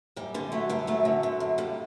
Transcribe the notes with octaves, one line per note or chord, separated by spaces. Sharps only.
F#2 G3
D3 G3
D3 F#3 A3
F#2 G3 B3
F#2 F#3 A3
D3
D3
F#2
G2 G3